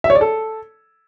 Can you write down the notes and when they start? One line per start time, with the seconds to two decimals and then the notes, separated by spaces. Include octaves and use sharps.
0.04 E5
0.10 C#5
0.15 D5
0.21 A4